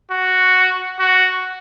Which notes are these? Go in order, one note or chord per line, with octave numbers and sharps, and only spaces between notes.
F#4
F#4